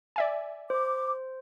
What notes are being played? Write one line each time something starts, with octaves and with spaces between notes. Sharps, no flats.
D5 E5 G#5
C5 D6